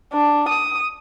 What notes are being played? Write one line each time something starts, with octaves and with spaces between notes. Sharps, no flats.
D4
D#6